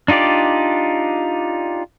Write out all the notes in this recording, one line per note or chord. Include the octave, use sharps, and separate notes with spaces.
D4 D#4 F4 G4 D5